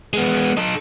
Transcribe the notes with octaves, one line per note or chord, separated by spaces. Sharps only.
G#3 B3
D#4 A4